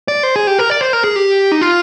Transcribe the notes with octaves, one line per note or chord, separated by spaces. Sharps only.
D5
C5
G#4
G4
A#4
D5
C5
A#4
G#4
G4
D#4
F4